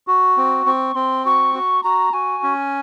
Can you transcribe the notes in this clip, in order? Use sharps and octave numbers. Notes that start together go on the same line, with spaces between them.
F#4
C4
C4 C#6
C4 C6
F#4 C#6
F#4
F#4 A#5
F#4 G#5
C#4